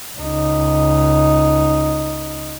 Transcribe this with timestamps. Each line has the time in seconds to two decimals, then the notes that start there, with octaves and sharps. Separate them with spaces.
0.17 C#2 D#4